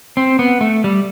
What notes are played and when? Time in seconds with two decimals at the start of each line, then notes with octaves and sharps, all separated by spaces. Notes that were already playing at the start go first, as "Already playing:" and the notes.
0.17 C4
0.39 B3
0.61 A3
0.84 G3